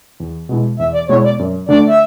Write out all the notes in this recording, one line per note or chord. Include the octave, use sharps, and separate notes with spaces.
E2
B2 G#3 B3 E4
E2 E5
D5
B2 G#3 B3 E4 C#5
D5
F#2
D3 A3 D4 D5
E5